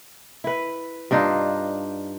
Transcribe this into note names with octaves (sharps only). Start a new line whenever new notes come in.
E4 B4
G2 D4 D#4 F4